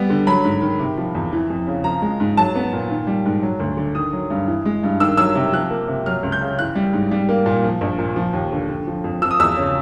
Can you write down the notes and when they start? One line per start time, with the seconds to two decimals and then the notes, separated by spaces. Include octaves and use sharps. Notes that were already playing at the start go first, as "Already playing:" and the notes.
Already playing: G3 B3
0.10 D3
0.27 F#3 B5
0.45 G#2
0.62 D#3
0.79 C3
0.97 F3
1.15 E2
1.32 E3
1.50 F2
1.67 C#3
1.84 F3 A#5
2.02 G#3
2.20 G#2
2.37 F#3 A5
2.55 B3
2.73 A#2
2.90 D#3
3.07 G3
3.26 G#2
3.43 F#3
3.60 D2
3.77 D3
3.95 D#3 D#6
4.13 F#3
4.30 G2
4.47 E3
4.65 G#3
4.83 G2
5.00 D#3 E6
5.17 F#3 E6
5.35 C3
5.53 F3 F#6
5.71 A#3
5.88 C3
6.06 F#3 F6
6.23 C#2
6.32 G6
6.41 C#3
6.59 E3 F#6
6.75 G3
6.93 G#2
7.11 G3
7.29 A#3
7.46 A#2
7.64 F3
7.81 A#1
7.99 A#2
8.16 F3
8.33 D#2
8.52 D3
8.69 D3
8.87 F3
9.04 F2
9.22 F3 E6
9.31 D#6
9.40 E2 E6
9.57 C#3